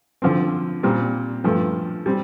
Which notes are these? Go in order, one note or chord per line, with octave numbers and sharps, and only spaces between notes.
D3 F3 C4
A#2 G3 C4
G2 F3 A3
G3 C4